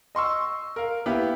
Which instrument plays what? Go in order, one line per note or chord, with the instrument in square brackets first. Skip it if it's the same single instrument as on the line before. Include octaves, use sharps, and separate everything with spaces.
[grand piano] D#5 C6 C#6 E6
A#4 F5
A#3 B3 E4 G4